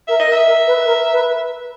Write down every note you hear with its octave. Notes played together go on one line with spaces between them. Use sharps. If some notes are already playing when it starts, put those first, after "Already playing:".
A#4 E5
D#5
A#4
E5
A#4
B4
A#4
B4